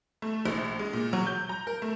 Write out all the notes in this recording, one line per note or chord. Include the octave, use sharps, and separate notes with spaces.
A3
A#1
G#3
A#2
F#3
G6
A#5
A#4
A3